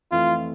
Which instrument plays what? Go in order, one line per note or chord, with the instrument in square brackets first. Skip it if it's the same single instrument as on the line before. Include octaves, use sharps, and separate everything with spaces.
[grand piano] F2 E3 A3 [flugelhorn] F4